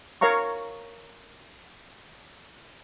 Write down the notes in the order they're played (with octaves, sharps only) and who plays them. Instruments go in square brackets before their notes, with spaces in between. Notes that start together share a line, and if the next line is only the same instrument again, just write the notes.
[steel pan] A#4 C#5 F5 A#5 C#6